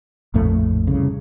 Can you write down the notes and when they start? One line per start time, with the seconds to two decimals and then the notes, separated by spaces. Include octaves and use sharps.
0.34 A#1 F2 A2 A3
0.87 C2 C#3